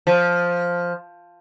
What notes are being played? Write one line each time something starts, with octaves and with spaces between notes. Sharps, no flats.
F3